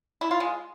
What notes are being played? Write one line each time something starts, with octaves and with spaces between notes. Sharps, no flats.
E4
F4
G#3